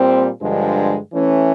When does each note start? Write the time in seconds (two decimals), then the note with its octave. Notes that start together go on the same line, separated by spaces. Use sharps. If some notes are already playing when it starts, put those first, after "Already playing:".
Already playing: A#2 G3 C4
0.42 G2 D3 F3 G#3
1.11 E3 A3 C#4